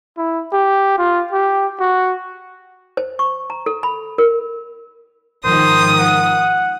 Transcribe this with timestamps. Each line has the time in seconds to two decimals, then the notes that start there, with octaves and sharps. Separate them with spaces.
0.17 E4
0.53 G4
0.98 F4
1.33 G4
1.80 F#4
2.97 C5
3.19 C#6
3.50 A#5
3.66 A4
3.83 B5
4.18 A#4
5.44 G#2 D#3 F3 C5 D#6
5.99 F#5